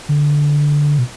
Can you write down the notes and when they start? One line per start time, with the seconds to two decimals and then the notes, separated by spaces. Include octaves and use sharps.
0.09 D3
0.98 B2